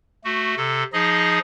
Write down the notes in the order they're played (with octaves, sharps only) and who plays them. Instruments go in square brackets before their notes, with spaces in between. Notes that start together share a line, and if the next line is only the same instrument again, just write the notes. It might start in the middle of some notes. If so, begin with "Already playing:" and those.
[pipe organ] A3 F#4
C3 A4
F3 D#4 G#4 D#5